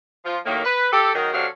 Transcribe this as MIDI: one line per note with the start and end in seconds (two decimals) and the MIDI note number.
0.24 0.38 53
0.24 0.38 65
0.45 0.63 45
0.45 0.63 51
0.45 0.63 54
0.45 0.63 58
0.64 0.88 71
0.91 1.13 67
0.91 1.13 69
1.14 1.33 51
1.14 1.33 54
1.14 1.33 63
1.14 1.33 68
1.14 1.33 70
1.33 1.46 48
1.33 1.46 54
1.33 1.46 61
1.33 1.46 62
1.33 1.46 69
1.33 1.46 77